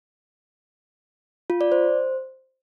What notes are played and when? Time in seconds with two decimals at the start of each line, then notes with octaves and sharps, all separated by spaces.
1.50 F4
1.61 D5
1.72 C5